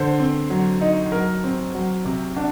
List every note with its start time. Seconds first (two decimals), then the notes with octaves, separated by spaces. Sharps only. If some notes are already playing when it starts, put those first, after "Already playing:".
Already playing: D3 C5
0.19 C4
0.50 F#3
0.81 D#4
1.12 F#3 A#4
1.44 C4
1.75 F#3
2.05 C3
2.36 D4 F#5